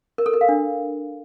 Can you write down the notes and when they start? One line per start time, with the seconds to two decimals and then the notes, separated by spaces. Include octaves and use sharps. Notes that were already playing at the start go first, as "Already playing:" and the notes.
0.18 A#4
0.26 A4
0.33 A#4
0.41 F5
0.49 D4